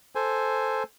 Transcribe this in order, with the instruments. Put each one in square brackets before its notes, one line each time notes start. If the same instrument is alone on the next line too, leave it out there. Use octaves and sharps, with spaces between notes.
[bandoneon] A4 C5 G#5